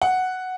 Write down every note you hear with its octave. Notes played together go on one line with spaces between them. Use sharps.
F#5